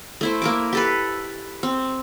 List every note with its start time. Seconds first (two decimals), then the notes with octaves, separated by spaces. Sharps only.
0.21 A3 E4 C5
0.42 A#3 A#4 D6
0.73 G4 A4 B4
1.63 C4